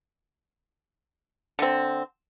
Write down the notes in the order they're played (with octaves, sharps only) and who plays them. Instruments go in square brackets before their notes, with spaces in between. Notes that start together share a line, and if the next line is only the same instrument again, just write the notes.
[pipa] D3 C4